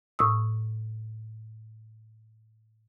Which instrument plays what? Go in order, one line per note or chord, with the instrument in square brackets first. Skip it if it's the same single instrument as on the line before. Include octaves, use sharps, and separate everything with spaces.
[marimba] A2 C#6 D#6 E6